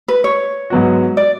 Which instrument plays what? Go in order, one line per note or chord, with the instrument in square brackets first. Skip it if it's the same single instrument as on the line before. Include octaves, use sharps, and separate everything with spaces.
[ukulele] B4
C#5
[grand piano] G#2 F#3 B3 F#4
[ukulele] D5